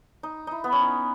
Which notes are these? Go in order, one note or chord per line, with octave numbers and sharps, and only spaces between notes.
D#4
D#4 E4
B3
C#4
D#4